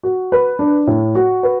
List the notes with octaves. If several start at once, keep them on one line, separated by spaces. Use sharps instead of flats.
F#4
B4
D4
A2
F#4
B4